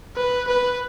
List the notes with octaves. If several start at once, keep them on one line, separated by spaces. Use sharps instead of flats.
B4
B4